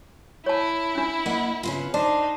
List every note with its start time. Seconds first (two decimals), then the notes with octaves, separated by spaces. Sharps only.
0.46 E4 C#5 A5
0.95 C#4 D4
1.26 A#3 D#5 F#5
1.63 C#3 B3 F4
1.94 D4 D#4 C5